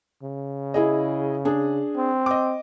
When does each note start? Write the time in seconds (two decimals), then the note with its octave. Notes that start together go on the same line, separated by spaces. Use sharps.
0.22 C#3
0.74 E4 G#4 D#5
1.45 D4 G#4
1.96 C4
2.26 D#5 D6